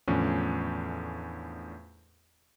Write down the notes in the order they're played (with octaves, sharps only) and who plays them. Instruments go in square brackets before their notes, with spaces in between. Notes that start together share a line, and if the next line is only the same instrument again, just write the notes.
[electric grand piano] E2 A2 D3 F3 C#4